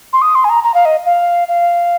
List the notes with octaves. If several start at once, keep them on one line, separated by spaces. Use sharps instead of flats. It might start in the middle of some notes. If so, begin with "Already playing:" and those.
C6
D#6
C6
G#5
A#5
A#5
F5
D#5
F5
F5